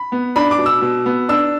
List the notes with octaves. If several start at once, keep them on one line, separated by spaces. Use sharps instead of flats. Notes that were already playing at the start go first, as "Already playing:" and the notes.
Already playing: B5
B3
D4 B5
D6
B2
E6
B2
B3
D4 E6